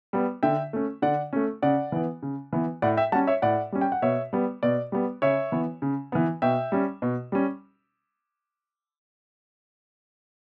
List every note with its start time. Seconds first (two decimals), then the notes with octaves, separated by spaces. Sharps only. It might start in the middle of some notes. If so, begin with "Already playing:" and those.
0.13 G3 B3
0.43 D3 E5 G5
0.73 A3 C#4
1.02 D3 D5 F#5
1.33 A3 C#4
1.62 C#3 D5 F#5
1.92 E3 B3
2.23 C#3
2.53 E3 B3
2.82 A2 D5 F#5
2.97 E5 G5
3.12 G3 F#5 A5
3.15 C#4
3.27 C#5 E5
3.42 A2 D5 F#5
3.72 G3 C#4
3.81 G5
3.92 F#5
4.02 B2 C#5 E5
4.33 G3 B3
4.63 B2 D5
4.92 G3 B3
5.22 C#3 C#5 E5
5.52 E3 B3
5.82 C#3
6.12 E3 B3
6.42 B2 E5 G5
6.72 G3 C#4
7.02 B2
7.32 G3 C#4